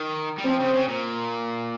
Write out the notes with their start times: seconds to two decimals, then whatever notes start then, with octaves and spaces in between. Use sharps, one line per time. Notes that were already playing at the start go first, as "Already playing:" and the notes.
Already playing: D#3
0.38 G3
0.45 F3 C4
0.60 C#3
0.74 C#3
0.88 A#2